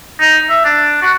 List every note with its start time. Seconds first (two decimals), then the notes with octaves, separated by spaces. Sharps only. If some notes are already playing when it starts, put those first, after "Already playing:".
0.21 D#4
0.50 E5
0.65 D4
1.02 F#4